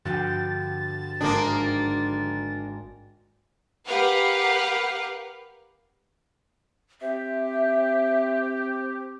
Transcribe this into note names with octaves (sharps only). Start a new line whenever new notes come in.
G2 D3 F3 F#4 G5 A6
G#1 A#3 D4 D#6
G4 A#4 B4 F5 F#5
C4 G4 E5